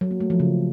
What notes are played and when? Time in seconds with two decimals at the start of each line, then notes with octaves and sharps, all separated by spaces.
0.01 F#3
0.11 A#3
0.20 A3
0.30 F3
0.40 C#3